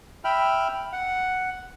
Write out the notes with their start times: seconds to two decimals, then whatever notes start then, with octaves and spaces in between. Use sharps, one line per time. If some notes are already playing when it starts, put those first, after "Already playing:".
0.24 E5 G5 B5 F6
0.93 F#5